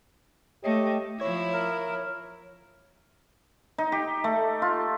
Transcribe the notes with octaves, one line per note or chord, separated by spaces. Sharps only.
A3 G4 C#5 D#5
F3 E4 C#5 G#6
A#4
D#4
G4
A3
F4